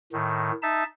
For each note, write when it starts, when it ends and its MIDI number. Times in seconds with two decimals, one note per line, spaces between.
0.13 0.51 45
0.13 0.51 51
0.63 0.84 63
0.63 0.84 76
0.63 0.84 81